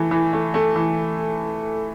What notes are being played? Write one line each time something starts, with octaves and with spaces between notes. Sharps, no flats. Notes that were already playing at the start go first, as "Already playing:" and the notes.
Already playing: E3 A3
E3
A3
A3
E3